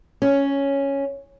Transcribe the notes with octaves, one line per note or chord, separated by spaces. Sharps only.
C#4